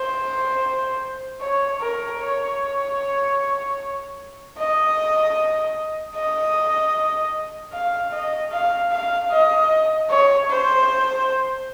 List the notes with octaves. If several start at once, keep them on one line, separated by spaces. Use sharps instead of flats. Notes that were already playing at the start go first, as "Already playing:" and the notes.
Already playing: C5
C#5
A#4
C#5
D#5
D#5
F5
D#5
F5
F5
D#5
C#5
C5